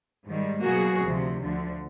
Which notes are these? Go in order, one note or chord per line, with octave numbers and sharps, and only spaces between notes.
G#2 D#3 G3
B2 F#3 A#3 F#4 G#4
D2 C3 F3
D2 D3 F3